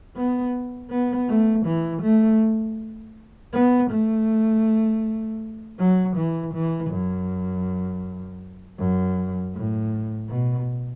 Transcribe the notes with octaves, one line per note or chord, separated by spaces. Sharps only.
B3
B3
A3
E3
A3
B3
A3
F#3
E3
E3
F#2
F#2
A2
B2